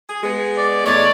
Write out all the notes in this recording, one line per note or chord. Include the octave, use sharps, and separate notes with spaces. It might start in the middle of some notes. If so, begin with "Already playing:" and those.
G#4
G#3 B3 G#4
D5
E2 G#3 A3 C#5 D5